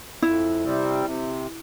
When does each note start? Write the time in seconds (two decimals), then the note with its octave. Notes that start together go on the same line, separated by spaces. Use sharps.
0.22 F2 E4
0.64 C3 G3 C4
1.06 C3